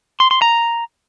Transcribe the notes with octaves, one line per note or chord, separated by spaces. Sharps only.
C6
C6
A#5